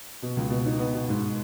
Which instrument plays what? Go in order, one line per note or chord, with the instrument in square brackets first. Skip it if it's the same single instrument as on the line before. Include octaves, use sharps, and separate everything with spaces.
[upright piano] B2
C#2
B2
D#4
B3
B2
G#2